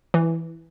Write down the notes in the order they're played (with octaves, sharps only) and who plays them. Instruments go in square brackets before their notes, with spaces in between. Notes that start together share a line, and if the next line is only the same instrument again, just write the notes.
[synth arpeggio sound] E3